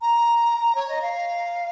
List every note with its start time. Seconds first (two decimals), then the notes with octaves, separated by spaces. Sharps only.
0.02 A#5
0.75 C#5
0.89 D#5
1.02 F5